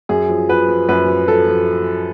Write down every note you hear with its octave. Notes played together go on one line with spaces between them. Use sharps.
F#2 G#4
F3
F3 B4
F3
F#2 B4
F3
F3 A4
F3